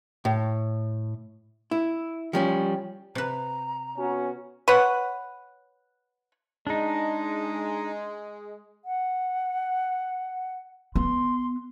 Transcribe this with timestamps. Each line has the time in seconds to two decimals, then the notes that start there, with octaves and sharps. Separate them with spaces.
0.25 A2
1.71 E4
2.33 F3 G3 C#4
3.15 C3 B4 A#5
3.98 B3 C#4 F#4
4.68 B4 C#5 F#5
6.67 G#3 D4 D#4
8.85 F#5
10.96 B3 C6